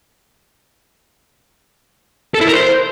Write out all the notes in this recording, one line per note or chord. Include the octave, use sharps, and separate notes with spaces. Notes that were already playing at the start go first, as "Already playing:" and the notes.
A4
E4
A#4
C5